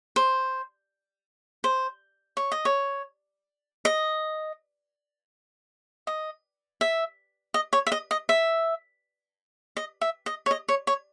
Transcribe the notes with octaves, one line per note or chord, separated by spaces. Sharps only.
C5
C5
C#5
D#5
C#5
D#5
D#5
E5
D#5
C#5
E5
D#5
D#5
E5
D#5
E5
D#5
C#5
D#5
C#5
C#5